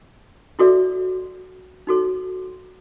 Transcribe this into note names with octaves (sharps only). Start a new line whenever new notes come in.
E4 F#4 A4 D5 E5
D#4 F#4 A4 C#5